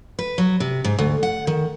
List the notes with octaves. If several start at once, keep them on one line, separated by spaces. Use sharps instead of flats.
B4
F#3
C3
G#2
D2
F#5
D#3